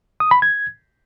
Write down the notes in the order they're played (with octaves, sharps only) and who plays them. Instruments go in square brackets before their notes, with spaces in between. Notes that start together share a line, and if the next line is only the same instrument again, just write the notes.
[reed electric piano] D#6
B5
G#6